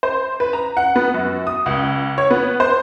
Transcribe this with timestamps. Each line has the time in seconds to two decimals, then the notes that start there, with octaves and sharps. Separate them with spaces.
0.03 C5
0.40 B4
0.53 A#5
0.77 F#5
0.96 B3
1.14 F#2
1.47 D#6
1.66 C#2
2.18 C#5
2.31 B3
2.60 C5